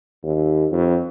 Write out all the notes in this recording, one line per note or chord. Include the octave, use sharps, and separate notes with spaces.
D#2
F2